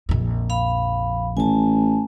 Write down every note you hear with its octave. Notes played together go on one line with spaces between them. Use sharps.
A#1 F2
F5 B5
A1 G#5 A5